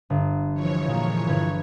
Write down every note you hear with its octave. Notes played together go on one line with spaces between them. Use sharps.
G1
E3 F3 C#5
A#2 G#3 A#3
G1 B4 G#6